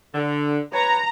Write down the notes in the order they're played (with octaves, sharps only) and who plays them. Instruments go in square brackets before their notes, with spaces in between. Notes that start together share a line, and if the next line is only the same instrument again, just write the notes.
[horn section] D3
[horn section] B4 C#5 [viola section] A#5